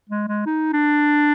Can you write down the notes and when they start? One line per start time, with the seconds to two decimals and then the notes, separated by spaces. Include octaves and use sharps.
0.10 G#3
0.28 G#3
0.46 D#4
0.73 D4